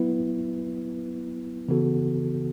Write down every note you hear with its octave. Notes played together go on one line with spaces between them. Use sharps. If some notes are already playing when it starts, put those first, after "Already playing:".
Already playing: F#3 B3 E4 B4
C#3 E3 B3 F#4 A4